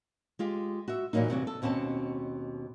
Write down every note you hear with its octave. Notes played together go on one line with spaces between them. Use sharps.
G#3 F4 G4
F#4 E5
A#2 E3 F#3 A#3 D#4
G2 C3 E3 F#4
A4
D#2 B2 C4 C#4 A5